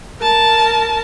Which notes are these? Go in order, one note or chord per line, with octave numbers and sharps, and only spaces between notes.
A#4 A5